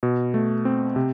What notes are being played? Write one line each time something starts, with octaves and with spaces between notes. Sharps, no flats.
B2
A3
C4
C3